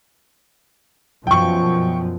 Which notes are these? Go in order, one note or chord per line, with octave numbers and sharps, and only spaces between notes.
F#2 B2 F3 G5 C#6